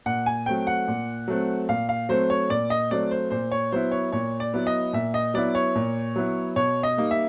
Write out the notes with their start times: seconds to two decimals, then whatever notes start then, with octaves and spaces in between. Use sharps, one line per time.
0.06 A#2 F#5
0.26 G#5
0.46 F#3 A3 C4 G5
0.67 F#5
0.88 A#2
1.28 F#3 A3 C4
1.69 A#2 F5
1.89 F5
2.09 F#3 A3 C4 C5
2.30 C#5
2.50 A#2 D5
2.70 D#5
2.91 F#3 A3 C4 D5
3.11 C5
3.31 A#2 C5
3.52 C#5
3.72 F#3 B3 E4 C5
3.92 C#5
4.12 A#2 C#5
4.40 D5
4.53 F#3 B3 E4
4.67 D#5
4.93 A#2 E5
5.14 D#5
5.34 F#3 B3 E4 D5
5.55 C#5
5.76 A#2
6.16 F#3 B3 E4
6.56 B2 C#5
6.83 D#5
6.97 G3 A#3 D#4
7.11 E5